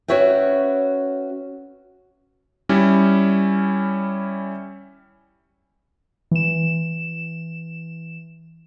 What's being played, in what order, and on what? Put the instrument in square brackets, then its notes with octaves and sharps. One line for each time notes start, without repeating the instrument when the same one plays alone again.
[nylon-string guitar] C#4 F#4 B4 C#5 E5 G5
[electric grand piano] G3 C#4 E4
[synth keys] E3 E7